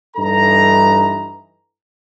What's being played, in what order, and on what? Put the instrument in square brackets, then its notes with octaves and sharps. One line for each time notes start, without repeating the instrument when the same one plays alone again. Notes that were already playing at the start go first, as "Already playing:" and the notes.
[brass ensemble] G2 E3 D#4 A4 A#5